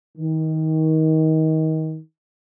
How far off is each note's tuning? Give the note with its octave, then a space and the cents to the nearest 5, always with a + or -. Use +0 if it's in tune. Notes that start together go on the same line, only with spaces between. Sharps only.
D#3 +25